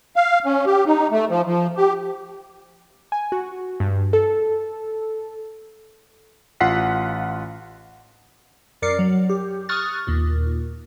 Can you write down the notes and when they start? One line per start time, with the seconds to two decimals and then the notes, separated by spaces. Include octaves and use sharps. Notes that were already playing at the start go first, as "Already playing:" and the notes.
0.16 F5
0.45 C#4
0.66 G4
0.86 D#4
1.11 A3
1.30 F3
1.46 F3
1.77 G4
3.12 G#5
3.32 F#4
3.80 G2
4.13 A4
6.60 A1 F4 F#5 B6 C7
8.82 F#2 A#4 D5 D6 C7 C#7
8.99 F#3
9.29 G4
9.69 C#6 D#6 F6 F#6 A6
10.07 D#2 A#2